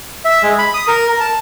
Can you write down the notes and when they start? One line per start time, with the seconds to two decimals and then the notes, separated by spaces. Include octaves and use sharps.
0.25 E5
0.43 G#3
0.58 B5
0.74 D#6
0.88 A#4
1.09 A#4
1.20 A5